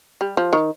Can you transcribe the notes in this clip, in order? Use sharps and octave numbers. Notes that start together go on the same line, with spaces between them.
G3
F3
D#3